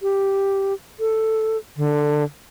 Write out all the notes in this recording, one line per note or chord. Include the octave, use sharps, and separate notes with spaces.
G4
A4
D3